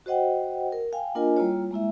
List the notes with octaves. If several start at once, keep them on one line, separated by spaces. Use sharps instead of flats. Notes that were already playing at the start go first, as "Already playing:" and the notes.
F#4 C5 D#5 F#5 G5
A#4
F5 G5 G#5
A#3 D4 F4 A#4 D#5 G#5
G3 A#3 E4 F4 C#5
G#3 A#3 E4 E5